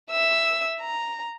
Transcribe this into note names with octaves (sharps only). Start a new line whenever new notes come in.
E5 E6
A#5